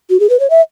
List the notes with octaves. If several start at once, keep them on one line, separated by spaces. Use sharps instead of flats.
F#4
G#4
B4
C#5
E5